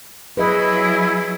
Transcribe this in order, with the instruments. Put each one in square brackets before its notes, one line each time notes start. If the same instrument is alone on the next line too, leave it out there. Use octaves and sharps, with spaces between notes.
[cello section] F#3 [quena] E4 [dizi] G#4 [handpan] B4 D#5